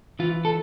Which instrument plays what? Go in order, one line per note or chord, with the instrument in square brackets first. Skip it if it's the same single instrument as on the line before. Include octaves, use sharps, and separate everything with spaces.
[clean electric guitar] E3 F4
A4